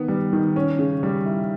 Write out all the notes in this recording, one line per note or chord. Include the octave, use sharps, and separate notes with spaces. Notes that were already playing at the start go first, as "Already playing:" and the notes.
Already playing: D#3 B3
G3
D#3
C#4
C#3
G3
E4